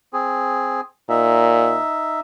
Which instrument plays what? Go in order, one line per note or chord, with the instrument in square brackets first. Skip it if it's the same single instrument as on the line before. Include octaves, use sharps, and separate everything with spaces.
[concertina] C4 G#4
[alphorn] A#2 [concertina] D#4 E5